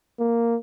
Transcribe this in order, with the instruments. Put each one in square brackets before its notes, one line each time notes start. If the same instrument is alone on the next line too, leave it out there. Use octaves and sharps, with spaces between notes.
[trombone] A#3